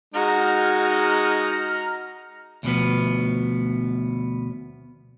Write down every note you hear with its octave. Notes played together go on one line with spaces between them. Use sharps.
G#3 D#4 F#4 A#5 F6
D2 B2 F3 B3